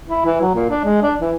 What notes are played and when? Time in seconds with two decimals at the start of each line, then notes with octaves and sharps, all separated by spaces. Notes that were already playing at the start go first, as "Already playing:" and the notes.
0.08 E4
0.25 E3
0.41 F#3
0.55 A#2
0.70 D4
0.85 G#3
1.02 D4
1.21 E3